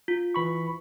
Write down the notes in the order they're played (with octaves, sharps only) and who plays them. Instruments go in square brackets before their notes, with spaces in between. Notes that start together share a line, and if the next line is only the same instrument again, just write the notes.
[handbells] F4
[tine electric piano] E3 B5 C#6